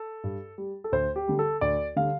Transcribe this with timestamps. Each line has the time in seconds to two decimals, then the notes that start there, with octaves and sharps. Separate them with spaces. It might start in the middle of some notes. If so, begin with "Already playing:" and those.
Already playing: A4
0.24 G2
0.58 G3
0.84 A4
0.92 D2 C5
1.16 G4
1.28 D3 G3
1.39 A4
1.61 D2 D5
1.96 D3 G3 F5